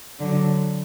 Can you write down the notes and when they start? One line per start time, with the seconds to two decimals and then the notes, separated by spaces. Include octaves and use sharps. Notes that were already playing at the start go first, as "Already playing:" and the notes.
0.19 D3 F#3